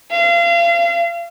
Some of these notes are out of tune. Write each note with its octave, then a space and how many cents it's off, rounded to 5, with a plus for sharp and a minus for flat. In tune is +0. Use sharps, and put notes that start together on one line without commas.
F5 -35